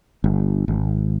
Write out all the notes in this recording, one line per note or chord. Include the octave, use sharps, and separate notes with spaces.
G1
G#1